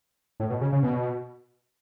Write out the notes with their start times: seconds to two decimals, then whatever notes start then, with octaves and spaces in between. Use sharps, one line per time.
0.40 A2
0.50 B2
0.61 C#3
0.73 C#3
0.83 B2